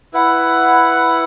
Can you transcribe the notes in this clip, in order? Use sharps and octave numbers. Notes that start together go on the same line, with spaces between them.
E4 B4 F#5